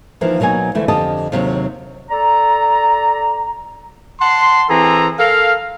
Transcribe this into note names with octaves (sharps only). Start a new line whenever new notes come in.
D#2 E3 F3 A#3
B2 F#3 A#3 D#4 G#5
D2 E3 A3
F2 D3 G4 D#5 A5
D#2 C3 F#3
A4 D5 A#5
F#5 A5 C6
E3 C4 G#4 A4 A#5
A4 A#4 F5